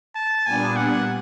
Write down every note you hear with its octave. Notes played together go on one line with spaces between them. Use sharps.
A5
A#2 G3 B3 D4 G#5
F#5